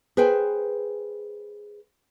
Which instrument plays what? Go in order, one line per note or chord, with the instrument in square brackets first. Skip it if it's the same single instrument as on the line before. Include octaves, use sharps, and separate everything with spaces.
[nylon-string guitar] G#4 B4 C5 G5 G#5